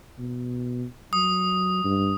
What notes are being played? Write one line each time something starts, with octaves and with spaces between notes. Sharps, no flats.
B2
F#3 D#6
G2